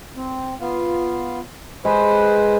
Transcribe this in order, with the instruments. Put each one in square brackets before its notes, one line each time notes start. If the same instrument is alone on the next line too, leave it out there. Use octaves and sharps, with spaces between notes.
[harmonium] C4
B3 F4
[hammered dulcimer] G#3 [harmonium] B4 C5